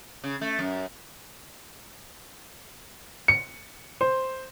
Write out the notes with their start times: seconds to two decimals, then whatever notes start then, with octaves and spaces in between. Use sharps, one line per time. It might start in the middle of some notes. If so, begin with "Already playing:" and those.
0.24 C#3
0.41 A3
0.59 F#2
3.28 C#7
4.01 C5